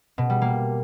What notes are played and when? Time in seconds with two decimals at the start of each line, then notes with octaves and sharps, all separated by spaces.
0.18 B2
0.30 G3
0.42 A#3